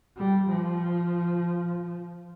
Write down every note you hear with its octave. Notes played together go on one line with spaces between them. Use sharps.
G3
F3